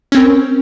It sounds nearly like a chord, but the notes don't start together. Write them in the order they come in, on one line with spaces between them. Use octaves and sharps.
C#4 C4 A#4